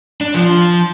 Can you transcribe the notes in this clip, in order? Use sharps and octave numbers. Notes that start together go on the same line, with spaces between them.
D4
F3